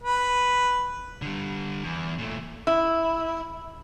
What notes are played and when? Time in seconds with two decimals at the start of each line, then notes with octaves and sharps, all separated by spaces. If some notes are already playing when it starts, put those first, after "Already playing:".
0.02 B4
1.22 D3 G3
1.83 E2
2.19 A#2 A3
2.67 E4